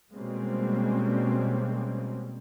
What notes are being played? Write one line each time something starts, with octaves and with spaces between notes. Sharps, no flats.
B2 G3 G#3 A#3 C4 C#4